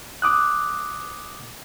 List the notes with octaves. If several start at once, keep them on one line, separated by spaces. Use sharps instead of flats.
D6 D#6 F#6